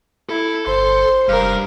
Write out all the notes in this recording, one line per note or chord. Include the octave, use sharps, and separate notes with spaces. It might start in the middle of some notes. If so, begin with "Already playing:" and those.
E4 A4
G1 C5 C6
F1 G2 A#4 F5